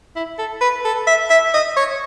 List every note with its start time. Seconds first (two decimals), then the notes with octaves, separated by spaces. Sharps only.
0.16 E4
0.39 A4
0.61 B4
0.85 A4
1.07 E5
1.30 E5
1.54 D#5
1.77 C#5